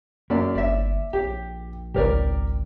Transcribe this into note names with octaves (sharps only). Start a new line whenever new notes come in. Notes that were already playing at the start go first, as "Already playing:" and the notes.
F#2 A#3 D5
G1 D5 E5
A#1 G4
G#1 C#2 G4 A#4 D5